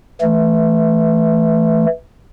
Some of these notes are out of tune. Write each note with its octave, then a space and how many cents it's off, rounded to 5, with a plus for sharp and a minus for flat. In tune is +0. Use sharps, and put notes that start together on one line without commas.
E3 +0 A3 +0